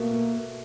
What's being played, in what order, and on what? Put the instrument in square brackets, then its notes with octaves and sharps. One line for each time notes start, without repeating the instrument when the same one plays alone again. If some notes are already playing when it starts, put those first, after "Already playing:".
Already playing: [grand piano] B2 A3 [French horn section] A#3
[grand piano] B2